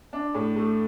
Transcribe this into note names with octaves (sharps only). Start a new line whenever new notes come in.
D4
A2
A3